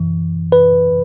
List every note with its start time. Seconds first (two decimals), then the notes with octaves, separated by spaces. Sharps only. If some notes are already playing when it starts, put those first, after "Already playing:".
Already playing: F#2 E3
0.52 B4